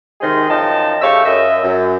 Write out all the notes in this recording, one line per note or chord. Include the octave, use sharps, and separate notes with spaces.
C3 D#3 G#3 G#4 C6
F#2 F3 D#4 D#5 G5 A5
C#3 A3 G4 F5 C#6 E6
F#2 D#5 E5
F#2